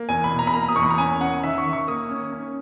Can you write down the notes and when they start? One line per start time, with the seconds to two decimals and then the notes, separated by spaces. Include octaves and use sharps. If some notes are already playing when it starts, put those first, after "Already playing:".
Already playing: A#3
0.09 E2 G#5
0.24 B5
0.31 B2
0.39 A#5
0.47 B5
0.54 A#3 A#5
0.68 D#6
0.76 E2 C#6
0.83 B5
0.90 A#5
0.98 C#4 G#5
1.21 C#4 F#5
1.43 D#3 E5
1.58 C#6
1.65 D#3
1.73 C#6
1.88 A#3 D#6
2.10 C#4
2.32 C#4